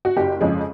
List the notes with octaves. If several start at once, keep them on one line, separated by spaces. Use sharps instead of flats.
F#4
F#1 G4
F2 C#3 F3 G#3